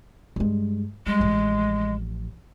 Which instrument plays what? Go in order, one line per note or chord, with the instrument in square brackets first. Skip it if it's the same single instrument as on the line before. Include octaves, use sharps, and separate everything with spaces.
[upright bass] G2 G#3
[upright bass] G3 [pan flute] G#3
[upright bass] A1 F3